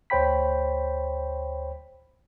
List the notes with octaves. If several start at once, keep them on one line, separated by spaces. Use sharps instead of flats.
D2 C5 C#5 G5 B5 B6